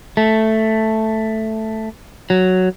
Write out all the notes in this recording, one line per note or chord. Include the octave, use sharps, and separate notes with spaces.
A3
F#3